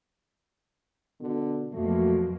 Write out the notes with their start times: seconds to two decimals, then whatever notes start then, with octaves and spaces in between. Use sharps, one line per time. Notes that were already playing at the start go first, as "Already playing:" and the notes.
1.21 B2 D3
1.73 F2 B2 F#3 A3 A#3